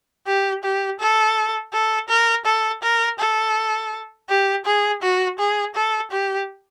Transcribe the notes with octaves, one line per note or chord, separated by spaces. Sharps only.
G4
G4
A4
A4
A#4
A4
A#4
A4
G4
G#4
F#4
G#4
A4
G4